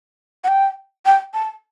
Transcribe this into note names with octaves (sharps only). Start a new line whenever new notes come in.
F#5
G5
G5
A5